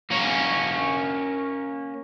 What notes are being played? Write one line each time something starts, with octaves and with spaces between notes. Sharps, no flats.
A#3 C#4